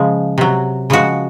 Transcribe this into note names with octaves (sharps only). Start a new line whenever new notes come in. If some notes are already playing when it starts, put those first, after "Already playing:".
Already playing: C#3 F3 G#3
C3 F#3
C#3 F3 G#3 F#4